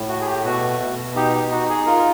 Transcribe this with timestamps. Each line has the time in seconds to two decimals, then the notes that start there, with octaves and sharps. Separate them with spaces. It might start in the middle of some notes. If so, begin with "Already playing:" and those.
Already playing: A2
0.08 A3 F#4
0.21 G#4
0.26 G4
0.44 B2 F#4
0.80 B2
1.16 D#4 G4
1.34 G4
1.51 D#4 F#4
1.70 G#4
1.86 F4 A#4